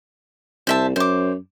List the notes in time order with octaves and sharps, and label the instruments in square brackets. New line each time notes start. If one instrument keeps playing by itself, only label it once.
[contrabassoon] C2 [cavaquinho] C5 E5 A5
[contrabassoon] F#2 [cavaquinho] C5 D6